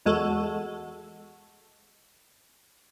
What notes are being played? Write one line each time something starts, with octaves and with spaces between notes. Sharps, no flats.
E2 G#3 F#4 A4